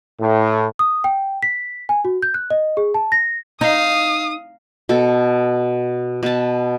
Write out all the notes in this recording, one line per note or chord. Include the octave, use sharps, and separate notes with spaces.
A2
D#6
G5
B6
G#5
F#4
G6
F#6
D#5
G#4
A5
A#6
D#4 F5 D#6
B2 A4
B2 A5